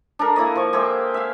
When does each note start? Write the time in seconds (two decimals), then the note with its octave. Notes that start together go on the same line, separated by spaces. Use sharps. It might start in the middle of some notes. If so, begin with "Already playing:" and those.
0.19 D4 A4 A#4
0.36 A#3 E4 D5 D#5
0.55 F3 C#6
0.73 G4 G#4 C5 E5
1.14 E5 F5